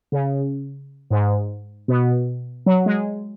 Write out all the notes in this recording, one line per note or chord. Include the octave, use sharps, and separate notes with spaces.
C#3
G#2
B2
F#3
G#3